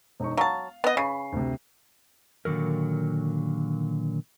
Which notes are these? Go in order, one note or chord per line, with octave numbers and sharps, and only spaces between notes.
E1 D#4 C#6
F#3 F5 A5
B3 D#5
C#3 B5 C7
D2 C3
A#2 D3 D#3 F#3 A#4